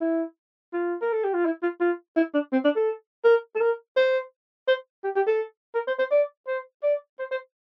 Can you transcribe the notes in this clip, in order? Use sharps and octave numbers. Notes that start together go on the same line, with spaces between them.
E4
F4
A#4
A4
G4
F4
E4
F4
F4
E4
D4
C4
D4
A4
A#4
A4
A#4
C5
C5
G4
G4
A4
A#4
C5
C5
D5
C5
D5
C5
C5